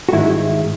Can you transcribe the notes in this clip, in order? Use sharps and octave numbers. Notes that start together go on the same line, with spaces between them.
F#4
G#2 D#3 G#3 E4